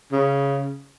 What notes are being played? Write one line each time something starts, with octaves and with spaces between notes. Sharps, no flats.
C#3